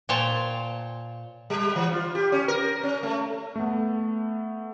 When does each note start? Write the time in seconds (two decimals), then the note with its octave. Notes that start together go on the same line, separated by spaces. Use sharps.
0.09 A#2 C5 C#5 F5 G5 A5
1.50 G3
1.76 E3
1.92 F4
2.15 G4
2.32 C#4
2.48 A#4
2.83 C#4
3.03 A3
3.56 A3 B3